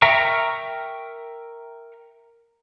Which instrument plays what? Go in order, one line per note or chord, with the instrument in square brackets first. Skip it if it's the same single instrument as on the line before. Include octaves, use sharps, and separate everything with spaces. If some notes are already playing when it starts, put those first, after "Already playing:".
[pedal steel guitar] A#4 E5 G5 A#5 C#6